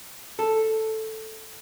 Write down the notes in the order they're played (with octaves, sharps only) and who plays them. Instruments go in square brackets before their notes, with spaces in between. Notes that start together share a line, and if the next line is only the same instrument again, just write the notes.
[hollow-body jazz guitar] A4